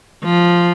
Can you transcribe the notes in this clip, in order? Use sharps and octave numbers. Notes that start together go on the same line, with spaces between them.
F3